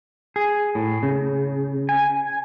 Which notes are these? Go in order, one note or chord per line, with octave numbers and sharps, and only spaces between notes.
G#4
A2
C#3
G#5